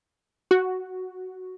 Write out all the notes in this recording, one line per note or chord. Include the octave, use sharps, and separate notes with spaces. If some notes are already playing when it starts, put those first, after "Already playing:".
F#4